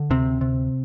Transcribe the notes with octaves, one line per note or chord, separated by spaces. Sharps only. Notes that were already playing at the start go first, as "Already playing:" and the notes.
Already playing: D3
D2 C3 C4
C3